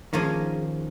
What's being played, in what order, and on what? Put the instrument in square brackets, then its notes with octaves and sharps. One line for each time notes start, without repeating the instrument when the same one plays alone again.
[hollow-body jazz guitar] D#3 [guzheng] F3 A#3 C#4 G#4